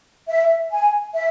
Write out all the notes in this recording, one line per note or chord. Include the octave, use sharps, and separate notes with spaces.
E5
G#5
E5